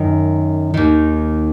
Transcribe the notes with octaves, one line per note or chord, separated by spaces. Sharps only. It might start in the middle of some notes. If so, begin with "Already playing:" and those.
Already playing: F#2 D#3
D#2 D#3